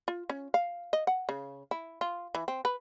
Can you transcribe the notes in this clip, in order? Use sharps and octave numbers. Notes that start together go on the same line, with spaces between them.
F4
C#4
F5
D#5
F#5
C#3
E4
F4
E3
C4
B4